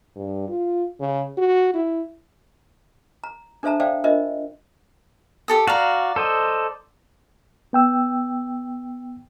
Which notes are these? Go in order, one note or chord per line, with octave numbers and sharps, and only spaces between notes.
G2
F4
C#3
F#4
E4
A#5
D4 A4 C5 E5 A5 A#5
A4 C5 D5 E5 F5 G5
D4 F4 A#4 C5 D#5 E5
G4 A4 D#6
F#4 D5 F5 A#5
A4 C5 D#5
B3 G5 E6